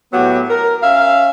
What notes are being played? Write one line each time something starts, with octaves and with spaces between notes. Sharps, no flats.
A2 F#3 B3 F#4 G4
A#4
C#4 E5 F5